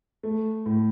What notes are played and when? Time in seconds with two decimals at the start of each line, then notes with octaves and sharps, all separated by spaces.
0.23 A3
0.66 A2